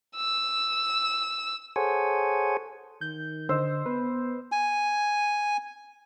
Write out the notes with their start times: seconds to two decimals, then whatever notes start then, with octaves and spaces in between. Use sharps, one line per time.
0.16 E6
1.76 G#4 A4 C5 C#5 F#5 G#5
3.01 D#3 G6
3.49 D3 C5 D#5 E6
3.86 B3 B4
4.52 G#5